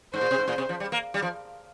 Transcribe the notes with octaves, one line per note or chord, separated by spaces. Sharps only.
G#2 C5
A#2
C3
G#2
A#2
C3
F3
G3
A#3
G3
F3